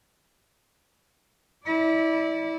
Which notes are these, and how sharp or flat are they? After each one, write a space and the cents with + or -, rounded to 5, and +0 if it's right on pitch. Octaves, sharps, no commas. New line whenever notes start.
E4 -25 D5 -10